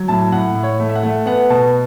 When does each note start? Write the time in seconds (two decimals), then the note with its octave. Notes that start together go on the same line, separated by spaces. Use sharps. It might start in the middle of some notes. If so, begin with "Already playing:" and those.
Already playing: F#3
0.08 A2 A5
0.32 A2 F#5
0.55 A2
0.63 C#5
0.80 A3
0.89 E5
0.95 F#5
1.03 A3
1.26 B3 F#5
1.50 B2 A5